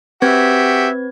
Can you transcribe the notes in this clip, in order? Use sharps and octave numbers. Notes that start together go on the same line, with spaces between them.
C4 F#4 G4 B4 E5 G#6